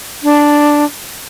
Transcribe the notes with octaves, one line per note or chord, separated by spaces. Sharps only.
D4